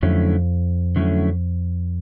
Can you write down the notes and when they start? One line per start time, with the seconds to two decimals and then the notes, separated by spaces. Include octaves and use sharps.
0.02 F2 D3 F#3 A3 C#4 E4
0.96 D3 F#3 A3 C#4 E4